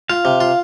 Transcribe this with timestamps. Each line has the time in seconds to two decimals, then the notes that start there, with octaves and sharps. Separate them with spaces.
0.09 F4 F5
0.25 C3
0.41 F4